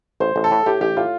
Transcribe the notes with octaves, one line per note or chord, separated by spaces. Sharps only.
A1 C5
A1
A4
A2
A2 G4
A1 G4
A2 F4